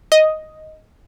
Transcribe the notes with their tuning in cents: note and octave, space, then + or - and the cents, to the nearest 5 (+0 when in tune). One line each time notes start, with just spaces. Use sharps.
D#5 +5